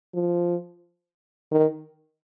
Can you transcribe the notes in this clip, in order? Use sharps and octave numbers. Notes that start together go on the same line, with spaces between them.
F3
D#3